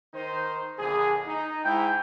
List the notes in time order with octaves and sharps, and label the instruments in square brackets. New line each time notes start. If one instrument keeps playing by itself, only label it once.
[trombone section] D#3 D#4 C5
A#1 D3 G#4
D#4
[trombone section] G#2 E4 [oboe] G5